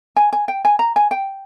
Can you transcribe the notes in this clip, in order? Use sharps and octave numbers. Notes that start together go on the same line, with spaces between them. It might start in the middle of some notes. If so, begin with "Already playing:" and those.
G#5
G#5
G5
G#5
A#5
G#5
G5